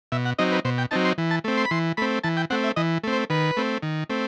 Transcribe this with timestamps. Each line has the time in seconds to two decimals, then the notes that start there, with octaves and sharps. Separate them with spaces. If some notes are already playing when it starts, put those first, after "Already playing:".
0.12 B2 E5
0.25 F#5
0.39 F#3 C4 D#4 D#5
0.52 B4
0.65 B2 C5
0.78 G5
0.91 F#3 C4 D#4 A5
1.05 C6
1.18 E3
1.31 A5
1.44 A3 C4
1.57 C6
1.65 B5
1.71 E3 C6
1.97 A3 C4 B5
2.24 E3 A5
2.37 G5
2.50 A3 C4 F#5
2.64 E5
2.76 E3 D#5
3.04 A3 C4
3.12 C5
3.30 D#3 B4
3.57 A3 C4
3.82 D#3
4.10 A3 C4